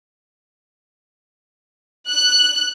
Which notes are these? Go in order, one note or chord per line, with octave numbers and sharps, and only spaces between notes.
F#6